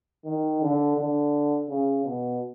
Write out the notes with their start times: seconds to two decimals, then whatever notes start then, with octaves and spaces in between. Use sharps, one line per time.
0.25 D#3
0.62 D3
0.97 D3
1.68 C#3
2.04 B2